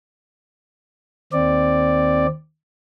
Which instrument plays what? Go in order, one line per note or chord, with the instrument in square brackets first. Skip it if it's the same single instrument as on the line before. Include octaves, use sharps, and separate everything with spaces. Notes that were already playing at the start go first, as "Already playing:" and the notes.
[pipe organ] D#2 C4 D5